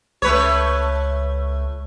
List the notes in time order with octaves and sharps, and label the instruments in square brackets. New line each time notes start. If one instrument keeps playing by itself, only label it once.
[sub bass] C#2 [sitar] A3 B4 C#5